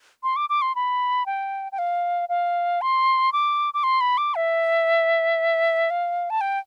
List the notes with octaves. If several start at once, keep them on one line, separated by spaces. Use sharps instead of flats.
C6
D6
D6
C6
B5
G5
G5
F5
F5
C6
D6
D6
C6
B5
D6
E5
F5
A5
G5